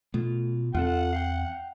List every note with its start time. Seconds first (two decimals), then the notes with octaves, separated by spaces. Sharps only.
0.14 B2 A3 F4
0.75 E2 A#3 C4 F4 A4 F#5
1.13 F5 G5